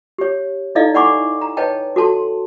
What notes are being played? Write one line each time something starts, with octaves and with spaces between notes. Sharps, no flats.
G4 C#5
D#4 E4 A4 D5 D#5 F5
D5 F#5 G#5 B5 C#6 D6
A#5
B4 C#5 D#5 G5 A5
F#4 A4 A5 C6